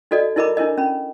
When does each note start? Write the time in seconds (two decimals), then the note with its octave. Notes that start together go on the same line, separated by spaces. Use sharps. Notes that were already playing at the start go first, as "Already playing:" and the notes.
0.11 D#4 F#4 A4 D5 D#5
0.36 D#4 E4 A#4 D#5 B5 D6
0.57 D4 E4 A#4 D#5
0.78 C#4 B5